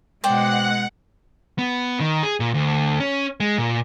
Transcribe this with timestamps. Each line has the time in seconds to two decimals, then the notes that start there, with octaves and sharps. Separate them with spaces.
0.24 B2 G#3 C5 D5 F#5 G5
1.58 B3
2.00 D#3
2.23 G#4
2.40 A#2
2.54 D2
3.00 C#4
3.40 G#3
3.58 A#2